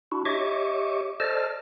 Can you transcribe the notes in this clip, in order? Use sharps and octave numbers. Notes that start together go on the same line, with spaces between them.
D4 E4 F#4
G4 C#5 D#5 E5 C#6 D6
A4 C5 D5 D#5 A5 F6